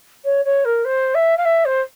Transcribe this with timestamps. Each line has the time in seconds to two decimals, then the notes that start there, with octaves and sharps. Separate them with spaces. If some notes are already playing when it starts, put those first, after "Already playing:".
0.25 C#5
0.45 C#5
0.65 A#4
0.85 C5
1.15 E5
1.37 F5
1.45 E5
1.65 C5